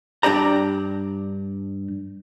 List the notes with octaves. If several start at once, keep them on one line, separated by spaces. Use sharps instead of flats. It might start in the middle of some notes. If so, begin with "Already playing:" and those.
G2 D4 G4 D5 A#5